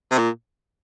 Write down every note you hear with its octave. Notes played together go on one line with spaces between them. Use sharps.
C3
A#2